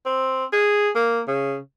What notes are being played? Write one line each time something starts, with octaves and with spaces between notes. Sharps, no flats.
C4
G#4
A#3
C#3